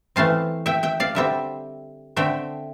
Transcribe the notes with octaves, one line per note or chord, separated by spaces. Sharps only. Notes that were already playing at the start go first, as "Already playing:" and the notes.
E3 A3 C4 F5 A5
E5 G5
E5 G5
D5 F5
D3 G3 C4 E5 G5
D3 A3 C4 E5 G5